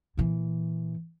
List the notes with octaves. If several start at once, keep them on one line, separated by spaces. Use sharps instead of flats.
A#2 E3